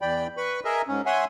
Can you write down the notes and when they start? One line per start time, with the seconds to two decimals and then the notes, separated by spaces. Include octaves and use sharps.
0.02 E2 E3 D5 G5 B5
0.37 B4 B5 C#6
0.65 G#4 A#4 D#5 E5
0.88 G#2 C#4
1.06 C#5 E5 F#5 G#5 C6